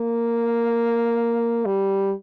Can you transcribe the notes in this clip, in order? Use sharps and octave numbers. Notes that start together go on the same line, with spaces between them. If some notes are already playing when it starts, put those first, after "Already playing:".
Already playing: A#3
G3